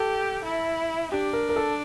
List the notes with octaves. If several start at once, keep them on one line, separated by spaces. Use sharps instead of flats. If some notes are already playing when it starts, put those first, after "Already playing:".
Already playing: G4 A4
E4
D4 G4
A#4
A#4
A4